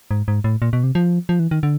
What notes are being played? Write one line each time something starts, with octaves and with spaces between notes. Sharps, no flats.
G#2
G#2
A2
A#2
B2
C3
F3
F3
E3
D#3
D3